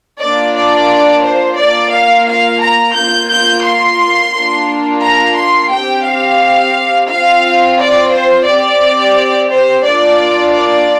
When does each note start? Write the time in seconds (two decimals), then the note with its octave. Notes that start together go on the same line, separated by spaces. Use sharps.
0.21 A#3 D4 F4 D5
0.56 D5
1.25 C5
1.58 A#3 F4 D5
1.94 F5
2.28 F5
2.63 A#5
2.96 A#3 F4 G6
3.31 G6
3.66 C6
4.35 A#3 D4 F4
5.04 A#5
5.38 C6
5.72 C4 G4 G5
6.07 F5
7.10 C4 F4 F5
7.78 D5
8.13 C5
8.47 C4 G4 D5
9.51 C5
9.86 A#3 D4 F4 D5
10.54 D5